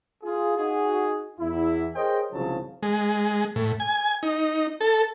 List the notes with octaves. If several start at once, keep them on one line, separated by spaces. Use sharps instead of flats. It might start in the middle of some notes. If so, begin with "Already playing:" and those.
F4 G#4
D#4 F#4 G#4
E2 E4
G#4 A#4 C5 C#5 D#5 G5
C2 G#2 C#3 F3 F#3 A5
G#3
A2
G#5
D#4
A4